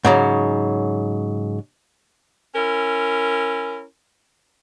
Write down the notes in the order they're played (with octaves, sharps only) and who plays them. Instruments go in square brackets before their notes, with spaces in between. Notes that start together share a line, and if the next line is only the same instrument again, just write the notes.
[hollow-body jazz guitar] G#2 C#3 F#3
[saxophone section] C#4 E4 A#4